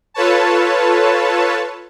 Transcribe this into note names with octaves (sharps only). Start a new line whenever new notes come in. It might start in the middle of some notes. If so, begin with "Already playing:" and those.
F4 A4 B4 C#5 A5